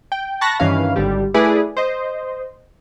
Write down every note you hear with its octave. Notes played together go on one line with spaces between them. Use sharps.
G5
A5 B5 C#6 F#6 A#6
G2 D#3 E3 C#4 B4 F5
G#1 D3 G3 G4
A3 E4 G#4 B4 D5
C5 D#5